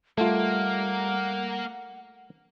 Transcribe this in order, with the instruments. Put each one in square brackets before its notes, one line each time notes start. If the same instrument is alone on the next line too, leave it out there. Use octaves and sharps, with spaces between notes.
[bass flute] G3 [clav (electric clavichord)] A3 F4 [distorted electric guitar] A#3 [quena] F#5